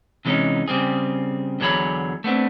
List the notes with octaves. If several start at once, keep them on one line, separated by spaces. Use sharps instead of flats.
C3 E3 G#3 C4 C#4 D#4
C#3 G3 C4 G#4
E2 D3 F#3 G#4 C#5 B5
A3 B3 C4 D4